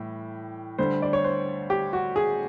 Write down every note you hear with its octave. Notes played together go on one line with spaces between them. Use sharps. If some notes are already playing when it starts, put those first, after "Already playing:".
Already playing: A2 E3 G3
D2 D3 G3 C5
D5
C#5
C5
G4
F#4
G#4